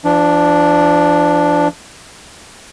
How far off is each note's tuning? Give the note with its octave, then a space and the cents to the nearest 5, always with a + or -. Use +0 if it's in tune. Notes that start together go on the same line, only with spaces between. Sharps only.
F3 -40 D4 +0